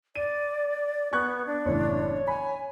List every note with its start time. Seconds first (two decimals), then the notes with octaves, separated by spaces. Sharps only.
0.15 D5 D#7
1.13 B3 C#6 F#6 G#6
1.47 D4
1.65 F#1 A2 E3 C#5
2.28 G#5 B5